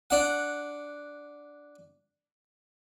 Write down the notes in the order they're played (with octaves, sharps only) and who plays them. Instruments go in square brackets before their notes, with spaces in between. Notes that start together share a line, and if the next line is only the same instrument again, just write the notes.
[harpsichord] D4 F#5